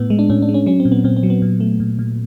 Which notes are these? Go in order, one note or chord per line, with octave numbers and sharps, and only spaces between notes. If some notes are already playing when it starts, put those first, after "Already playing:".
Already playing: A2 B3
G#3
D4
A2 C#4
D4
G#3
C#4
F#3 C#4
C4
A#2
B3
A#2 C4
C4
F#3
B3
A#2
A3
A#2
A#2